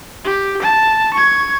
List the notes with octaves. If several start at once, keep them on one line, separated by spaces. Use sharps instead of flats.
G4
A5
C#6 G#6